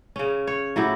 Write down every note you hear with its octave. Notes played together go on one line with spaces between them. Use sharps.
C#3 C#4
C#5
A2 F#3 E4 G4